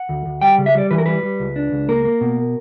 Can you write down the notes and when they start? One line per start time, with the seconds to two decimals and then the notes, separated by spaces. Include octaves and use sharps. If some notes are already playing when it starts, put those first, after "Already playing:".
Already playing: F#5
0.09 D2
0.26 D2
0.41 G3 G5
0.58 C#3
0.66 E5
0.75 G3 D5
0.91 E3 B4
0.98 A#4
1.06 G3 B4
1.23 G3
1.40 C#2
1.56 D4
1.72 C#2
1.89 A#3 A#4
2.05 A#3
2.21 B2